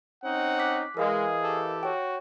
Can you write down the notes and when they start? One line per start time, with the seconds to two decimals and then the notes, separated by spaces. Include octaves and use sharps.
0.24 C4 C#4 D#4 F#5
0.59 D6 F#6 B6
0.97 E3 G#3 G#4 A#4 D#5 F5
1.43 G4 A4
1.83 F#4 C#5 G5